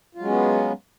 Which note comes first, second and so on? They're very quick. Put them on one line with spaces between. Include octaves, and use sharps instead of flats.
F4 F#3 G#3 C#4 B3